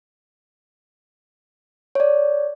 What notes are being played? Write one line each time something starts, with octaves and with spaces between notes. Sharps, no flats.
C#5 D5